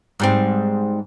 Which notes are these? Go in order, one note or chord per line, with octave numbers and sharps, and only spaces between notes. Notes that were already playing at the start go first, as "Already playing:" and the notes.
G#2 G3 C4